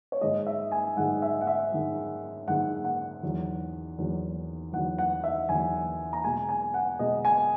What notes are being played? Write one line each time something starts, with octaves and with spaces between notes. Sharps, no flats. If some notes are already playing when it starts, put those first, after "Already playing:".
C#5
G#2 D#3 G#3 D#5
E5
G#5
G#2 D#3 G#3 F#5
E5
F#5
E5
G#2 D#3 G#3
G#2 D#3 G#3 F#5
F#5
E2 D#3 F#3
E2 D#3 F#3
E2 D#3 F#3 F#5
F#5
E5
E2 D#3 F#3 G#5
A#5
B2 G#3 G#5
G#5
F#5
B2 G#3 D#5
G#5